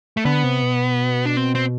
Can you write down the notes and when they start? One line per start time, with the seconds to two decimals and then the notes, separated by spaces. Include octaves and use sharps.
0.17 A3
0.25 D3 B3
0.44 C3
0.63 B2
1.25 D4
1.37 C4
1.55 C4